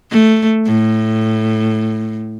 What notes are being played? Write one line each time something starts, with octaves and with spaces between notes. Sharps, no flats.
A3
A2